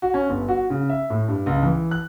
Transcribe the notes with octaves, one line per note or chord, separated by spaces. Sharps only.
F#4
C#4
G1
F#4
C#3
E5
A2
G2
C#2
E3
F#6